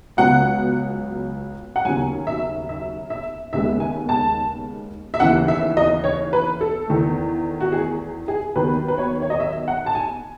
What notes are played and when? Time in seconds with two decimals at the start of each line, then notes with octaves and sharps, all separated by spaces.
0.17 C#2 C#3 F#3 B3 F#5
1.76 F#5
1.85 D#2 C#3 F#3 G#5
2.27 E5
2.69 E5
3.10 E5
3.53 D#2 C#3 G#3 B3 E5
3.80 G#5
4.09 A5
5.14 E5
5.20 D#2 C#3 E3 F#5
5.48 E5
5.77 D#5
6.04 C#5
6.33 B4
6.61 A4
6.88 E2 D#3 A3
7.61 F#4
7.72 G#4
8.28 G#4
8.56 D#2 D#3 F#3 B3 B4
8.88 B4
8.98 C#5
9.22 C#5
9.30 D#5
9.40 E5
9.68 F#5
9.86 A5
9.95 G#5